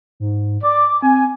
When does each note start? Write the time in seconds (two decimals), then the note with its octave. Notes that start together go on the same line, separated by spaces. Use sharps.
0.20 G#2
0.63 D5 D6
1.02 C4 G#5